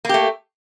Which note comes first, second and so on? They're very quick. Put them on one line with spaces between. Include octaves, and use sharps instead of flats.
A#3 G4 A3